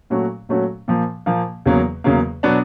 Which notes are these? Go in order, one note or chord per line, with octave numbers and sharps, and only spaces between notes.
A#2 F#3 A3 C#4 F#4
A#2 F#3 A3 C#4 F#4
A#2 F3 A#3
A#2 F3 A#3
E2 C#3 F#3 A#3
E2 C#3 F#3 A#3
B2 F#3 B3 D4